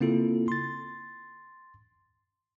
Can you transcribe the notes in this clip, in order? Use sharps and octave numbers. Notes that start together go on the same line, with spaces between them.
C#3 A#3 C4 E4 F4 A4
C6 A6